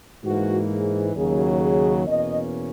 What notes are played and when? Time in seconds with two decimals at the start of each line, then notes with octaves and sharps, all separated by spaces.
0.24 G#2 E3 A#3 F#4
0.71 G#4
1.15 D#2 C#3 F#3 G#4
1.61 G#4
2.06 E2 B2 A#3 C#4 D#5